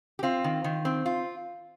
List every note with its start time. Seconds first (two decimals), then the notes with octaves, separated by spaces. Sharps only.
0.19 G4
0.23 C4 F4
0.44 D#3
0.64 D#3
0.85 C4
1.06 F4